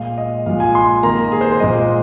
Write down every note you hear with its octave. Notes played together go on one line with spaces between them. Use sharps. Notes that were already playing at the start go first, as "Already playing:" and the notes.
Already playing: A#2 G#3 F5
D#5
A#2 F3 G#3 F5
G#5
C6
D#3 A#3 A#5
G#4
C5
C5
A#2 F3 G#3 D#5